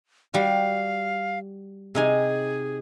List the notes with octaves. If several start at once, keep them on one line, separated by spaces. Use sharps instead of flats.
G3 F#4 F5
C3 D#4 G#4 G#5